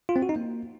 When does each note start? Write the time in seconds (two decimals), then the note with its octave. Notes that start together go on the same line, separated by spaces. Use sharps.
0.09 F4
0.16 C4
0.22 F#4
0.29 D#4
0.36 A#3